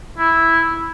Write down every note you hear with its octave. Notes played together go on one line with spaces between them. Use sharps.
E4